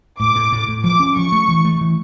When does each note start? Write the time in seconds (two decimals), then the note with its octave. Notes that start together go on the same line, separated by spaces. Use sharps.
0.20 A2 D6
0.36 A2
0.52 A2
0.68 A2
0.84 F3 D6
1.00 C#4
1.16 F3 C#6
1.32 A3
1.48 E3
1.65 A3
1.81 E3